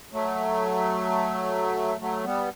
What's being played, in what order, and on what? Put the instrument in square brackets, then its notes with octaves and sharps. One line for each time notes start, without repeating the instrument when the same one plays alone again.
[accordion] F#3 A3
F#3 A3
G3 B3